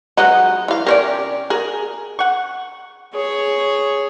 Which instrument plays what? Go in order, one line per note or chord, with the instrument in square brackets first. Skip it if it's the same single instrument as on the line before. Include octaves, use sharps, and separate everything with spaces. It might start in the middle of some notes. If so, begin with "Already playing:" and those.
[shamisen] F#3 G#3 D#4 [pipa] F#4 B4 F#5
[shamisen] E3 F5
[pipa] C3 C#4 G4 [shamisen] A#4 C#5 D5
[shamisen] G#4 [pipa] A#4
[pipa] F#5 C#6
[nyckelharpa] G#4 C#5